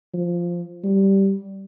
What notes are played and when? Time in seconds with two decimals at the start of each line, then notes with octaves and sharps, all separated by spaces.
0.14 F3
0.84 G3